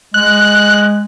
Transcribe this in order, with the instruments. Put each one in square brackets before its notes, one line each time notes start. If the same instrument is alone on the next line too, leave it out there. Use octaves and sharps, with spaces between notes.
[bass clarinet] G#3 [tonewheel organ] F#6